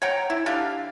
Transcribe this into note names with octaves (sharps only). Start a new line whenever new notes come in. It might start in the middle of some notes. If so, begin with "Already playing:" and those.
C#5 F#5 G5 A#5
E4
D3 D4 G4 F5